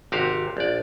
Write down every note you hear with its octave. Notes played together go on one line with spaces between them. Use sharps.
G#1 C3 F#4 G4 F5
A#1 D5